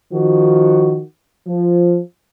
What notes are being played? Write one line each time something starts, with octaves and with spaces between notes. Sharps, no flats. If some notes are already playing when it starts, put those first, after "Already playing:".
D#3 F3 F#4
F3